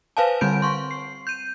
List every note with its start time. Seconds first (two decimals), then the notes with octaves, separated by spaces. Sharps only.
0.17 B4 C5 F5 G#5 A5
0.41 D3 G3 C4 G6 D7
0.62 C6 C#6
0.91 C7
1.27 G6 D#7